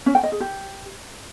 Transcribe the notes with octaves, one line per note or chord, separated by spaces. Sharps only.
C#4
G5
D#5
G#4
G4